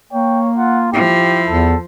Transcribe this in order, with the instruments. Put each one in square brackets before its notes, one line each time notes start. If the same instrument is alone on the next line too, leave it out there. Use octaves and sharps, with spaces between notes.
[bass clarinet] A#3 [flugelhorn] C#5 [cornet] G5
[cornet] F4 [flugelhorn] F#5
[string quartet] F3 [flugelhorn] E4 [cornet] G4
[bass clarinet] E2 [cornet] A4